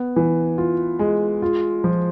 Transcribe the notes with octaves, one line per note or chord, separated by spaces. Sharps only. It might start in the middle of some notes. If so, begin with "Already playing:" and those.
Already playing: B3
E3
F4
G#3
F4
F3